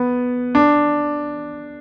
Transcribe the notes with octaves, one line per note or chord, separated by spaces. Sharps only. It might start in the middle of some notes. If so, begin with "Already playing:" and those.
Already playing: B3
D4